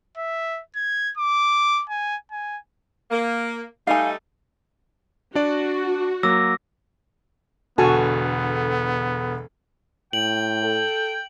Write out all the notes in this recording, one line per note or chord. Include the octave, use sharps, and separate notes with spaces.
E5
G#6
D6
G#5
G#5
A#3
G3 A3 D#4 F5 G#5
D4 F#4 D5
F#3 A#3 D6 E6 A#6
E1 D3 B3 F#4 A4 G#5 A5
A2 G5 F#7
A4